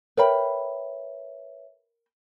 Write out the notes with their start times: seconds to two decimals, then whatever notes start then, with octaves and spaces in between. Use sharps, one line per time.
0.17 A#4 B4 C#5 E5 G5 B5